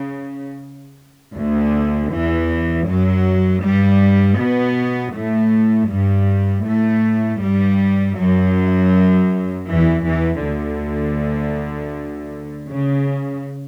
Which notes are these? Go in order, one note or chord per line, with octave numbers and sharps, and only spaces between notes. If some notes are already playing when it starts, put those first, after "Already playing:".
Already playing: C#3
D2 D3
E2 E3
F#2 F#3
G2 G3
B2 B3
A2 A3
G2 G3
A2 A3
G2 G3
F#2 F#3
E2 E3
E2 E3
D2 D3
C#3